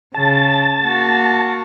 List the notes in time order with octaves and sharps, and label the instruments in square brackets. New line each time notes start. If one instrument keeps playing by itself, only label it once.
[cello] C#3 [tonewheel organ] A5
[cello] A#3 F#4